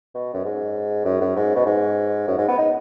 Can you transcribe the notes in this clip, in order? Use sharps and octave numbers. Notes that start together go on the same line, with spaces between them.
B2
F#2
G#2
F#2
F#2
G#2
B2
G#2
F#2
G#2
B3
D#4